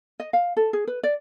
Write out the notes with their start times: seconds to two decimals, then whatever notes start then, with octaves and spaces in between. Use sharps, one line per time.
0.20 D#5
0.33 F5
0.57 A4
0.73 G#4
0.87 B4
1.03 D5